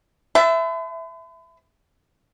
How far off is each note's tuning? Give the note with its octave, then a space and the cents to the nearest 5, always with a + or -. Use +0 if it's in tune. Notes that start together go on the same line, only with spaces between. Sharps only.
B4 +45 E5 +5 A5 -5